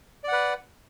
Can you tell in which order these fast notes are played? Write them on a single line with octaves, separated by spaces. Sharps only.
D5 F#5 B4